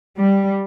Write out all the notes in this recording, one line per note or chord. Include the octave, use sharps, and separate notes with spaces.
G3